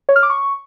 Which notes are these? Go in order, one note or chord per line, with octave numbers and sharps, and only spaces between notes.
C#5
F6
D6
C#6